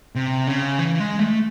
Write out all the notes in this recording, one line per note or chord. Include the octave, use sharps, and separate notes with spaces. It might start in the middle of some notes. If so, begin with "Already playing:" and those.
C3
C#3
E3
G#3
A3